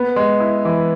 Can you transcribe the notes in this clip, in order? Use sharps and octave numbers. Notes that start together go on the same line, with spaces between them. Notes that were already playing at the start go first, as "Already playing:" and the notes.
Already playing: B3
G#3
E4
E3